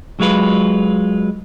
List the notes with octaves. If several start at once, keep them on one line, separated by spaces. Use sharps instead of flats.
F#3 G#3 F4 B4